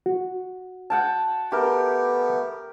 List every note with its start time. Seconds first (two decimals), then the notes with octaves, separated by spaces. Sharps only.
0.06 F#4
0.90 F#5 G5 A5
1.52 A3 B3 G4 A#4